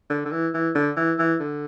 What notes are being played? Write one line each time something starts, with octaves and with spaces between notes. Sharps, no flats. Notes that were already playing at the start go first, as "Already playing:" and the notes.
D3
D3
E3
E3
D3
E3
E3
D3